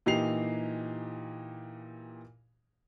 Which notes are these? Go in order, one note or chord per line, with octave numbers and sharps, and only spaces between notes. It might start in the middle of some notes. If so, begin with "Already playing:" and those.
A#2 E3 D#4 G4 C7 F7